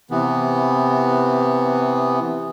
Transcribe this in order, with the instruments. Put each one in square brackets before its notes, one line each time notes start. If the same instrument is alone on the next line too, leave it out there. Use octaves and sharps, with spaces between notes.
[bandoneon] C3 E3 B3